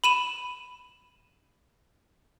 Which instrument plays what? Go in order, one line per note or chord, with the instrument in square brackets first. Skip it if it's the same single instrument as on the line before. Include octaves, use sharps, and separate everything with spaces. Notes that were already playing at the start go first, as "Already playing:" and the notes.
[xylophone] B5 D#7 E7